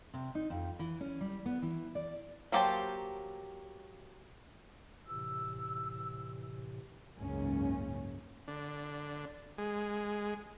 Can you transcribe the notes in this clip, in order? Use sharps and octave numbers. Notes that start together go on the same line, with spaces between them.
C3
D#4
F2
E3
C#4
G3
B3
E3
D5
F#3 A#3 G4 C5 A5
A2 C3 E3 E6
F#1 C#2 G#2 C#3 A#3 C#4
D3
G#3